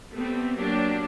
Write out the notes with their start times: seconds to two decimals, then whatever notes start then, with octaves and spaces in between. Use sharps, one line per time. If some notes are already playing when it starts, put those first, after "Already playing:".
0.11 G3 A3 B3 C4
0.55 F#3 A#3 D4 G4